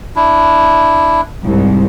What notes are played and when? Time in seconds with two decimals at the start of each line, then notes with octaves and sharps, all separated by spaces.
0.16 D4 E4
1.44 C2 G#2